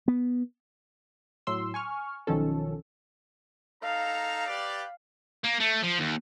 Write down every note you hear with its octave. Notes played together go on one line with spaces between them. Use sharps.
B3
A2 F#3 C6 E6
G#5 C#6 F6
B1 D#3 F3 C#4 A4
D#4 A4 F5 A#5
G4 B4 D5
A#3
A3
F3
D#2